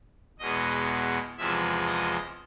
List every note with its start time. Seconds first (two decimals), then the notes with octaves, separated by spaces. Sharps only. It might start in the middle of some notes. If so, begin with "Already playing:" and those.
0.39 E2 B2 G#3 D#5
1.38 E2 C3 F3 G#3 E5
1.87 D#5